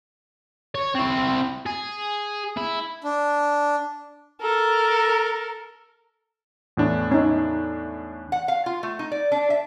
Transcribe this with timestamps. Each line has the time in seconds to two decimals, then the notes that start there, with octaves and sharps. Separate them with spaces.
0.75 C#5
0.95 C4 E4
1.66 G#4
2.57 E4
3.04 D4
4.41 A4 A#4
6.77 E2 A2 D4
7.11 C#4 D#4
8.32 F#5
8.48 F5
8.66 F4
8.83 A3
8.99 D#4
9.12 D5
9.32 D4
9.50 E5